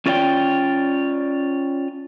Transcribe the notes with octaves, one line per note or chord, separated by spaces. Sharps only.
C#4 F4 C#5 D5 E5 G5